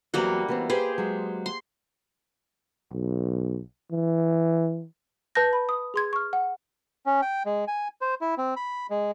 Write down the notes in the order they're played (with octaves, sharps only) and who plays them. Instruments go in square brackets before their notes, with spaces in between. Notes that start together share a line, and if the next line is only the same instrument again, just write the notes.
[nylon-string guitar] E2 F#3 C4 [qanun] G3 A#3 F#4
[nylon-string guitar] E3 B3 C4
[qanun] G4 G#4 C5 [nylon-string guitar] B4
[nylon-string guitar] F#3 G#3
[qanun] C6
[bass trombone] B1
E3
[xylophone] B4 A5 G6 A#6
B5
D#6
G#4 C6 G#6
C#6 F6
F#5
[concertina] C#4
G5
G#3
G#5
C5
E4
C4
B5
G#3